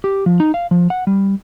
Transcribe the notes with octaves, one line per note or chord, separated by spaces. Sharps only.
G4
F3
D#4
F5
F3
F#5
G3